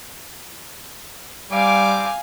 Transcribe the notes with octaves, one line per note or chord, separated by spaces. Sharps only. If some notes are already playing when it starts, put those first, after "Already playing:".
G3 C4 F5 G#5 D6